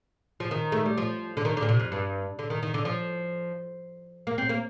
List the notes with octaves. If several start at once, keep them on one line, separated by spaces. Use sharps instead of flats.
F3
D#3
A3
G3
F3
D3
D#3
D3
A#2
C3
F2
G2
D3
D#3
D#3
D3
F3
A#3
C4
A#3